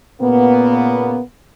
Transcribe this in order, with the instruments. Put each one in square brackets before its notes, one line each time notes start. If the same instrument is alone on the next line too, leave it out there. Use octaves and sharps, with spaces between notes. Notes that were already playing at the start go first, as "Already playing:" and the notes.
[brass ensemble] A#2 C#3 A#3 B3